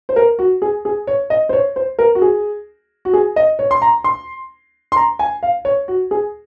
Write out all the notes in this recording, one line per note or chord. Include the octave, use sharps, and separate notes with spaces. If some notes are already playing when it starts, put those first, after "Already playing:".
C5
A#4
F#4
G#4
G#4
C#5
D#5
C5
C#5
C5
A#4
F#4
G#4
F#4
G#4
D#5
C#5
C6
A#5
C6
C6
A#5
G#5
F5
C#5
F#4
G#4